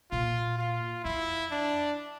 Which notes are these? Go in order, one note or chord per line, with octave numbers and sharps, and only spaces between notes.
A#2 F4
F4
F2 E4
D4